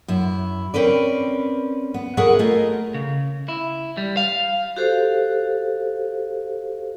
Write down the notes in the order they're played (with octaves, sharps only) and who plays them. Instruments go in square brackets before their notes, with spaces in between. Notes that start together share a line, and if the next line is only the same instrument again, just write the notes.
[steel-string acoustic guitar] F#2 E4
C4 C#4 A#4 B4 D5
B3
G#4 A#4 B4 C#5 E5 F#5
A3 F4 G#4 A#4 D#5
[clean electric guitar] C#3
E4
G3
F5
[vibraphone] F#4 G4 A4 C5 F5